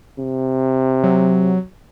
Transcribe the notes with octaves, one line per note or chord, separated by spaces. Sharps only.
C3
F#3